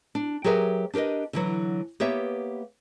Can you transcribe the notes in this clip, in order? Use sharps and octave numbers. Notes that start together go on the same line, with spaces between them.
D4
F#3 G4 G#4 A#4 B4 E5
D4 G4 A#4 B4 D#5
D3 E3 F#3
A#3 B3 G4 B4 C#5 E5